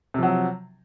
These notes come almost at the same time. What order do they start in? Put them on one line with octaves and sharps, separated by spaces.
C3 F3 F#3